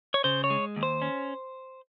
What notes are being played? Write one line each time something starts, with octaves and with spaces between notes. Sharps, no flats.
C#5
C#3 C5
C#5
G#3
D#2
C5
C#4